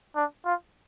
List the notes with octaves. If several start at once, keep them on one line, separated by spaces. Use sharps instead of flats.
D4
F4